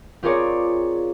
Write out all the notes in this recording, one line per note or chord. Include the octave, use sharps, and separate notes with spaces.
C4 F4 G#4 A#4 C#5 D5